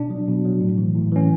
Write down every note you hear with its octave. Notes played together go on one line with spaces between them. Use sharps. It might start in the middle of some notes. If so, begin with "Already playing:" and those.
Already playing: B2 D4
F#3
B2
F#3
A2
E3
A2
E3 C#4